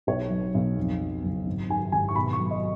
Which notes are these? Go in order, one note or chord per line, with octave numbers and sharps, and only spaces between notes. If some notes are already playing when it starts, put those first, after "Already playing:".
B1 C#5
F#3
B1
F2
F#3
F#1
G#1
D#3 G#5
G#1 G#5
C#6
B2 B5
C#6
F#3
D#5